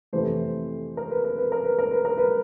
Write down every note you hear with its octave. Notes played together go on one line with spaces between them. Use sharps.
F2 C3 E3 A3 C5
A#4
B4
A#4
B4
A#4
B4
A#4
B4
A#4
B4